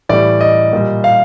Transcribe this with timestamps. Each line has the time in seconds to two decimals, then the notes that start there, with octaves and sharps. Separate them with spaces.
0.09 A2 E3 G3 D5
0.41 D#5
0.73 A#2 G3
1.04 F5